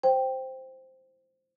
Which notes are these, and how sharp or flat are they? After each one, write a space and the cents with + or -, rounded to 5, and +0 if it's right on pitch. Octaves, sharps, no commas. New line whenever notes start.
C5 +0 G5 +0